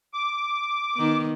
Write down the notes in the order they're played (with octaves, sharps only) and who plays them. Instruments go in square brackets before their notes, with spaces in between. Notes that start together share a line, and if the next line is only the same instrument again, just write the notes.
[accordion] D6
[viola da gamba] D#3 B3